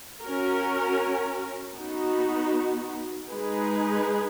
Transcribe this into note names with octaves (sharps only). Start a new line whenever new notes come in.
C#4 F#4 A#4
B3 D#4 F#4
G#3 D#4 G#4 B4